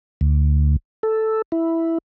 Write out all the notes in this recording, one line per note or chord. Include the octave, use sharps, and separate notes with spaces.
D2
A4
E4